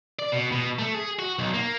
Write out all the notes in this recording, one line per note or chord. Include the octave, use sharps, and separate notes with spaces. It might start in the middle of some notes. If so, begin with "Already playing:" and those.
D5
B2
B2
A3
G#4
F#4
B1
A#3